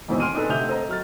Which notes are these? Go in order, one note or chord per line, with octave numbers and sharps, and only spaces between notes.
F2 G#2 B2 D#3 E3 C4
G#5 C6 F6 D7 D#7
D4 D#4 G#4 A4 B4
D2 C3 E5 D#6 G6 F7
A4 C5 D#5 A#5
F#3 F6 A6